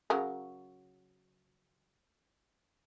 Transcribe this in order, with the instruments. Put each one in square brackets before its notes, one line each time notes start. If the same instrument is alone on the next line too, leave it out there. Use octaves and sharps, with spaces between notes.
[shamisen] C#3 F#3 A#4